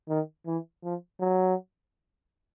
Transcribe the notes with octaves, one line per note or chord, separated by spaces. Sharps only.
D#3
E3
F3
F#3